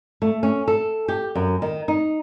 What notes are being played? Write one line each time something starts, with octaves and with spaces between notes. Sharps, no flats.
A3
C#4
A4
G4
F#2
D#3
D#4